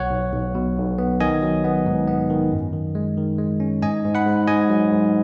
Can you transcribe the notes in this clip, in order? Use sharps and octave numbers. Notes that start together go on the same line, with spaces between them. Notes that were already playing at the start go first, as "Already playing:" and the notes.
Already playing: B1 C#5 F#5
B1
B1
B2
B1
B3
D#3 D#5 G#5
F#3
B3
G#2
B3
D#3
F#2
D#3
G#3
D#3
G#3
C#4
G#2 D#5 G#5
G#2
F#5 B5
G#2
G#2 D#5 G#5
F#3
G#2